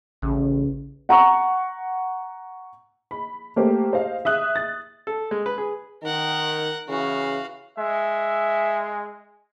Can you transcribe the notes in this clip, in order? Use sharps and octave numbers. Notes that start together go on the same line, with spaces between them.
A1 C#3
F#5 A#5 C#6
B5
A3 A#3 G4 C5
C5 D#5 F5
E5 D#6 F#6
A6
A4
G#3
B4
G#4
D#3 A#4 F#5
C#3 E3 F#4 F5
G#3 E5